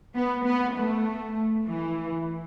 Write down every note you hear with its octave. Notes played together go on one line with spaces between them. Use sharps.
B3
B3
A3
E3